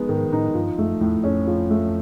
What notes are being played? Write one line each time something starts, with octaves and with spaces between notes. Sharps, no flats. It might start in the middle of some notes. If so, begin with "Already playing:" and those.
Already playing: G#3 B3 D#4
G#2 D#3
A2 D#4
G2 F3
F#2 A3
E2 A2
F2 C#4
F3
A3